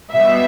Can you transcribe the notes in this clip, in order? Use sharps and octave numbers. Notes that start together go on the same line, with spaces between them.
B2 G3 B3 E5